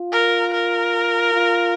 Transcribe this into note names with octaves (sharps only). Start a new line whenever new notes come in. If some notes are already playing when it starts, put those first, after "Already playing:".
Already playing: F4
A#4
A#4
F4